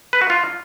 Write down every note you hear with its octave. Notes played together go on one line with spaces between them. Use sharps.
B4
F#4
F4